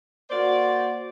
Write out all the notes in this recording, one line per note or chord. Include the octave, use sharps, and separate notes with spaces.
A#3 F#4 C5 D5